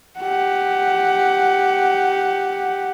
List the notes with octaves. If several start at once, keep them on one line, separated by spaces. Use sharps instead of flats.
G4 F#5